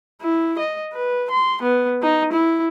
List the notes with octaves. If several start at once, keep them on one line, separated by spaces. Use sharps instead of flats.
E4
D#5
B4
C6
B3
D#4
E4